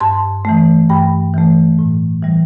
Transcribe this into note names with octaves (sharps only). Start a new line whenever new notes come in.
G2 A5 C6
E3 A3
G2 G5 B5
E3 A3
A2
E3 G3